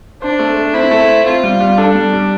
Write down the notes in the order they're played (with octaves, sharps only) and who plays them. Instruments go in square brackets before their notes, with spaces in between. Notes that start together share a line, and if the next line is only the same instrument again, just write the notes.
[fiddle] D4 [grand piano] C5
[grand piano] A3
A3
[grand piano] C4 [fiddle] E4
[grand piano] A3
C5
[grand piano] C4 [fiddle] F4
[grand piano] G3
G3
[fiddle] D4 [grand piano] A4
[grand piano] G3
G3